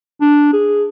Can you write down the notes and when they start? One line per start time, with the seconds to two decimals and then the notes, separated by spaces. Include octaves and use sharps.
0.21 D4
0.53 G#4